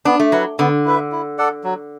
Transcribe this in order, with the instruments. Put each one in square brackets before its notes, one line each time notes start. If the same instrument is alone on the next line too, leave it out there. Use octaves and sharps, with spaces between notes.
[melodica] B3 [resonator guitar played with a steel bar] D4
[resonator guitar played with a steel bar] A3
[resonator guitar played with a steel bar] F#3 [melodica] E4 B4 F#5
[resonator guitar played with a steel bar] D3 [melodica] B3
[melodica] E4 B4 E5
E4
A4 D5 F#5
F#3